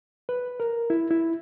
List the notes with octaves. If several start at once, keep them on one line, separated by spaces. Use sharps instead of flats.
B4
A#4
E4
E4